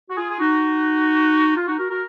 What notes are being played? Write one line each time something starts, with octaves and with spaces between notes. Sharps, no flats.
F#4
F4 G#4
G#4
D#4 F#4
F4
D#4 F#4
F#4 A#4
F#4 A#4